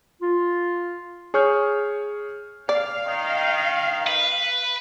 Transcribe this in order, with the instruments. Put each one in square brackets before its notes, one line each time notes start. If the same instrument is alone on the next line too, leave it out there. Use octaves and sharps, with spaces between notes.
[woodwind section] F4
[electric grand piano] G#4 C#5 C#6 F6 G6
[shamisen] D5 [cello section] F5
[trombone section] D#3
[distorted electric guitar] B4